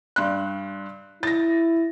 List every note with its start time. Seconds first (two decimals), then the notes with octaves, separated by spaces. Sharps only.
0.16 G2 C6 F#6
1.23 E4 A6 A#6